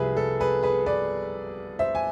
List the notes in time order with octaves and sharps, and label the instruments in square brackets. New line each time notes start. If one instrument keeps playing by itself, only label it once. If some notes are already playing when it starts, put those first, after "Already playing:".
Already playing: [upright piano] C2 C3 F3 G#4 B4 E5
A4
G#4 B4
G#4 B4
B4 D5
C5 E5
G#5